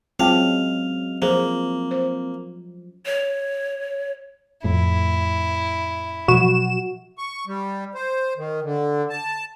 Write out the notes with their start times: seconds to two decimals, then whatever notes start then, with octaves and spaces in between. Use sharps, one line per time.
0.20 F#3 G#3 C4 C#4 F4 F5 G5 A5
1.22 F3 A#3 G#4 C5
1.91 C5
3.06 C#5
4.64 F2 A2 E4
6.28 B2 F3 F#3 F#4 E7
7.18 C#6
7.47 G3
7.95 C5
8.37 D#3
8.63 D3
9.10 A5